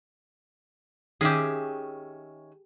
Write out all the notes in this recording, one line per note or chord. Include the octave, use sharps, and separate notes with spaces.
D#3 C#4 G4 G#4 E5